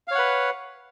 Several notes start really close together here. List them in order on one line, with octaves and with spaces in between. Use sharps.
F5 C#5 F#5 B4